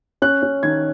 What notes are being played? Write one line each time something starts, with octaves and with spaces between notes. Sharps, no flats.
C#4 F#6
C#4
D#3 G#6